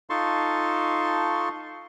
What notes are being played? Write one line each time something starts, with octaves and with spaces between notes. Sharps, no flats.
D#4 F4 A4 A5 C6 C#6